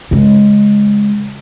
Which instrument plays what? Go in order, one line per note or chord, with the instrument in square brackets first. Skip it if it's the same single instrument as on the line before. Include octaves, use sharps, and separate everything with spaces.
[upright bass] C#3 G#3